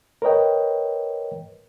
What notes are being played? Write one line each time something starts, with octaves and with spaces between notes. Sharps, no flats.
A#4 B4 C#5 D#5 G5